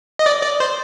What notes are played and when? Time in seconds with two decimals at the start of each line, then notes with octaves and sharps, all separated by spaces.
0.19 D#5
0.26 D5
0.43 D5
0.60 C5